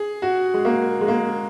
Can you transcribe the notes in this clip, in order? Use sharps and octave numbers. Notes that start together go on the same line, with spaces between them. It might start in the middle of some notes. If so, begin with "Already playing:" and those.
Already playing: G#4
F#4
G#3
A#3
G#3
A#3